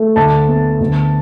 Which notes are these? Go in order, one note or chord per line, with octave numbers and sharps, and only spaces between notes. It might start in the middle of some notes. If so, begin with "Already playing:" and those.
Already playing: A3
D2 A5
B3
D2